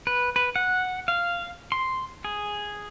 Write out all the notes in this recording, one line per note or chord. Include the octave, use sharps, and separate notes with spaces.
B4
B4
F#5
F5
C6
G#4